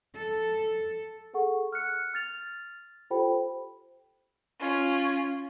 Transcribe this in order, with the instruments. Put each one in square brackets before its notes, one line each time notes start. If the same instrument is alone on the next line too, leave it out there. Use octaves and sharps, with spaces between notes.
[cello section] A4
[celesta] G#4 A4 F#5 C#6
F6 F#6 C#7
F6 A6 F7
F4 G4 A4 C5 G5 B5
[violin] C#4 F4